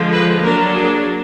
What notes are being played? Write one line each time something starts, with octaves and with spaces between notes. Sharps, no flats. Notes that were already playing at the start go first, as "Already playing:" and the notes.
Already playing: D3 F3 G#3
B4
F#3 A#3 D4 A#4
G#4